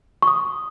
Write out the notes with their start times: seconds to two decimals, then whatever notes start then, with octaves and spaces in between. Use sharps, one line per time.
0.22 C#6
0.27 D#6